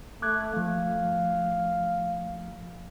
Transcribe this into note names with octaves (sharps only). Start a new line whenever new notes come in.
A3 D6 F#6 G#6
F3 A3 F5